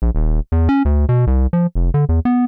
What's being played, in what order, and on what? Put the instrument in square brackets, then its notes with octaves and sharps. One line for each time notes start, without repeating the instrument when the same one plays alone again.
[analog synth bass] A#1
D#1
E2
C#4
D2
B2
C2
F3
F1
D3
E2
B3